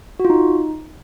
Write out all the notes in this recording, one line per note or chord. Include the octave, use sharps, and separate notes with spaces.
F#4
F4
D#4